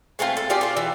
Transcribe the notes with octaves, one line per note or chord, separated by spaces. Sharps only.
G#3 A3 C4 F4
A4
F4 G4 G#4 D5
D4 F4
E3